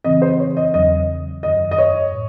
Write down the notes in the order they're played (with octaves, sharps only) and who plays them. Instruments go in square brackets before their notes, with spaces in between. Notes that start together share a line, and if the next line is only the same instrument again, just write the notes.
[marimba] C#3 E3 C4 [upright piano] D#5
[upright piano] C5
C#5
D#5
[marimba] E2 C#3 F#3 [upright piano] D#5
[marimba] F#2 D#3 F#3 [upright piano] D#5
[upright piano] D#5
C#5
[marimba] A2